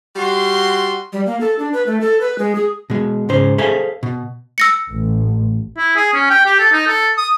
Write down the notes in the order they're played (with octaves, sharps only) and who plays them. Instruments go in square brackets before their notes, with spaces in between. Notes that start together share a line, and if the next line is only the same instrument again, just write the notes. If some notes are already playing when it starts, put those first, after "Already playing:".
[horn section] G3 F#4 C6
[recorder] G3
A#3
A4
D4
B4
A3
A4
B4
G#3
G#4
[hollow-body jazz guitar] B2 G#3
G#2 C#3 C5
G#4 A4 C5 E5 F5 G#5
B2
[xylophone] E6 A#6 C#7
[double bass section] A1
[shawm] E4
G#4
C#4
G5
G4
A4
D#4
A4
D#6